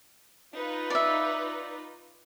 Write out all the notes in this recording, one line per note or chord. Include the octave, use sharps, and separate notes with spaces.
D#4 F4 B4
D5 E5